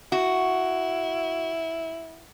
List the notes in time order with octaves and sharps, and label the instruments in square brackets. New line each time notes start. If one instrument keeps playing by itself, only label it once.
[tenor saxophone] E4 [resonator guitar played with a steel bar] F#4